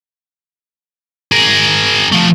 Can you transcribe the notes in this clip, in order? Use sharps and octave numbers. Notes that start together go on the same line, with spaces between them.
G#4 A#4
F3 A3